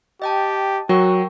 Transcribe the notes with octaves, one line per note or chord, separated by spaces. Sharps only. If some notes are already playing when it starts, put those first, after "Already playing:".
G4 D#5 G5 A5
F#3 F#4 A#4 G5 C#6